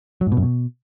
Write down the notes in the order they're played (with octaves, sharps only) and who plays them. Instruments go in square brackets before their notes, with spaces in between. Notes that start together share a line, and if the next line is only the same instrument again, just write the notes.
[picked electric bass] F#3
G#2
B2
F#2
B2